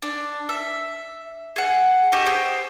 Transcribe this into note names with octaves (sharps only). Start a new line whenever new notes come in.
D4
E5
G#4 F#5
G4 A4 C#5 D#5
G#4 C5 G5